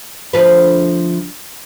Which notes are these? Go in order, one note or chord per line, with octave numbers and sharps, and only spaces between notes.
D2 F3 B4